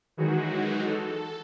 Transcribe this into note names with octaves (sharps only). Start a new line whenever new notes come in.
D#3 E3 F#3 G#3 D#4 F#4
A4